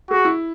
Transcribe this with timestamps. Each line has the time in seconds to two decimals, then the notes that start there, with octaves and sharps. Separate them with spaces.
0.10 F#4 G#4
0.25 E4